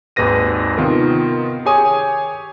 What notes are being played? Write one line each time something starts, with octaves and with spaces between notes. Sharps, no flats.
G#1 D#2 G#2 B4 A#6 D#7
C3 D#3 B3 F4 A#4
G4 G#4 C#5 G#5 C#6 D#6